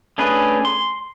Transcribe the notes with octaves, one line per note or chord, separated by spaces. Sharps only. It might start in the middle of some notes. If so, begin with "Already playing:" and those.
A3 C#4 D4 G#4 B4
C6